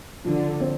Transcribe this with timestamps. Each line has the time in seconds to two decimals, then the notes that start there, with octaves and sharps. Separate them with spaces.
0.25 D3 F3
0.60 C4